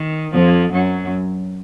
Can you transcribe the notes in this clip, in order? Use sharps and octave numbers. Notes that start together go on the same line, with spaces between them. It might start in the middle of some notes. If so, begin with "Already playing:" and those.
Already playing: D#3
F2 F3
F#2 F#3